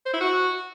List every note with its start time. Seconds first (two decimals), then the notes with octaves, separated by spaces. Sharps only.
0.06 C5
0.13 E4
0.21 F#4